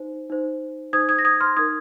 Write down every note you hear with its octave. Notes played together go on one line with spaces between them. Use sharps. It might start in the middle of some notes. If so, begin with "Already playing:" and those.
Already playing: D#4 C5
D#4 C5
D#4 C5 D#6 G#6
D#6 G#6
A#6
D#6 G#6
C6 F6
D#4 A#4 D#6 G#6